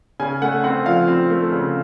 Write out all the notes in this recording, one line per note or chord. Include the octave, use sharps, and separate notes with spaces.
C#3 G#5
A3 F#5
C4 F#5
F3 F5
C4
A3
C#3